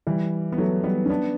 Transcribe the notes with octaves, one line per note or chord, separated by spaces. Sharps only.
E3 G3
B3
F#3 A3
G3 B3
C#4
B3 D4